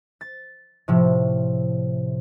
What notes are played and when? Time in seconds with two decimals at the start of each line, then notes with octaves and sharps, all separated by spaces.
0.21 A6
0.88 A2 C3 F3